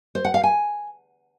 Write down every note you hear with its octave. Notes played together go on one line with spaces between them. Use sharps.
C5
F#5
F5
G#5